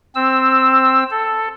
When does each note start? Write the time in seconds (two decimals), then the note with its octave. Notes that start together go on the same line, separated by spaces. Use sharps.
0.15 C4 E6
1.11 A4